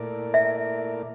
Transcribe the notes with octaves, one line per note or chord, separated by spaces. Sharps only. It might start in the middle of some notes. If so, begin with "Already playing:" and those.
Already playing: A#2 A3 E4 A#4 D5
E5